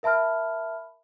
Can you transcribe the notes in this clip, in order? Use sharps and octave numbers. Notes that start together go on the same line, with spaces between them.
A#4 E5 A5 B5 F6